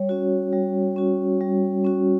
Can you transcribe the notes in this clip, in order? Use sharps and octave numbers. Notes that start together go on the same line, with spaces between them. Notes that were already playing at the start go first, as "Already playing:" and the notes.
Already playing: G3 C#5
C#4 F#4
G3
C#4 F#4
G3
C#4 F#4